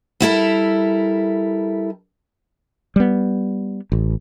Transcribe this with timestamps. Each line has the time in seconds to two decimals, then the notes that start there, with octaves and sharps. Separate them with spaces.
0.20 G3 E4 A4 A#4
2.96 G3 B3
3.92 A1